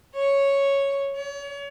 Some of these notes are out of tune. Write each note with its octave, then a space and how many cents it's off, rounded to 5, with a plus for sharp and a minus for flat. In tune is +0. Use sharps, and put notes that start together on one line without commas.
C#5 +0
C#5 +35